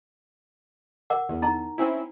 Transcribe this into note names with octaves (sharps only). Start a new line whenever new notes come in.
A#4 F#5 D6
E2
D#4 A#5
C4 C#4 E4